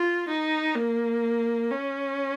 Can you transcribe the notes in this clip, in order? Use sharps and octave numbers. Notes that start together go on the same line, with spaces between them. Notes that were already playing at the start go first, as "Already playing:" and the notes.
Already playing: F4
D#4
A#3
C#4